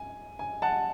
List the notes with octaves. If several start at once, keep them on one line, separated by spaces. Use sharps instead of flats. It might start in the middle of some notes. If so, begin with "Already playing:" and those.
Already playing: G#5
G#5
F#5 A5